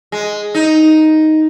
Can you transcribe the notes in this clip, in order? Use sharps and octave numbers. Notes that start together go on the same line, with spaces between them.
G#3
D#4